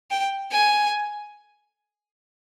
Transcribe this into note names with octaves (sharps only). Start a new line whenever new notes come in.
G5
G#5